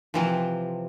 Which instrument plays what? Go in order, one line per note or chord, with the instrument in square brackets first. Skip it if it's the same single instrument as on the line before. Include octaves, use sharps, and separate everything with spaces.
[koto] C3 E3 F3